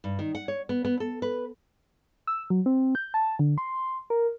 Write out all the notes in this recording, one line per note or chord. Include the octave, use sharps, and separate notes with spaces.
G2
D#3
F#5
C#5
B3
B3
A4
B4
E6
F#3
C4
G6
A5
D3
C6
A#4